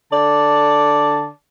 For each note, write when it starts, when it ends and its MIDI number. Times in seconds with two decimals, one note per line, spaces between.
0.12 1.30 50
0.12 1.30 74
0.12 1.30 81